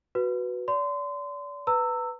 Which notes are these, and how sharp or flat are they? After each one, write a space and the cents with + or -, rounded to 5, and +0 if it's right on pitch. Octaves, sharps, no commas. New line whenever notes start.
F#4 +0 B4 +0
D5 -35 C6 -30
B4 +5 A#5 -35 E6 +0